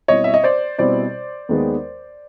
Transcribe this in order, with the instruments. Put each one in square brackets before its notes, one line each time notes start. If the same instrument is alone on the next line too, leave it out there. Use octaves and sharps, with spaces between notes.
[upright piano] B2 G3 C4 E4 [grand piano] C#5 D#5
[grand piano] E5
D#5
C5 D5
[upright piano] B2 G3 C4 E4 [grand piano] C5 D5
[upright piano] D#2 D#3 G#3 B3